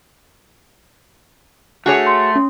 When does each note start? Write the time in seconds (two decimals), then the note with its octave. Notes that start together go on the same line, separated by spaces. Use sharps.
1.86 A3 F#4 G#4 C#5
2.07 C6
2.36 C#4